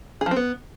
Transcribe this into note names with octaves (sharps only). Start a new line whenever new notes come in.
G#4
F3
C4
B3